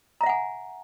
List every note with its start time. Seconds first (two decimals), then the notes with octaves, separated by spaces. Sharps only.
0.21 A#5
0.23 E5
0.26 F#5
0.29 G#5